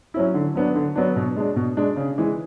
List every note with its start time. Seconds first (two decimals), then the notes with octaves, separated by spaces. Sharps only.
0.14 F#3 C#4 E4
0.34 D3
0.55 F#3 B3 D4
0.75 D3
0.96 F#3 B3 D4
1.16 B2
1.36 G#3 D4
1.56 B2
1.77 G#3 D4
1.96 C#3
2.18 E3 G#3